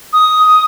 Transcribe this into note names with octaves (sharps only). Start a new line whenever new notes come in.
D#6